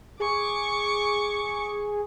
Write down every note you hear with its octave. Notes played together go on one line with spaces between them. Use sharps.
G#4 C#6 D6